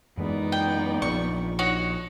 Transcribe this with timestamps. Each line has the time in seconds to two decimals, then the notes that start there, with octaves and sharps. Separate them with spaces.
0.17 F#2 E3 G#3 B3 D#4 D5
0.52 G5
1.02 A#1 F3 C#6
1.59 D#4 F#4 C#5